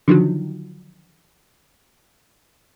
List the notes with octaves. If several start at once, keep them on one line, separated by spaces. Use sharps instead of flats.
D3 D#3 F3 F#3